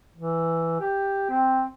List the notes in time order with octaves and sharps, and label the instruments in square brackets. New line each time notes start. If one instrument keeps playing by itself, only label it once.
[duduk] E3
G4
C4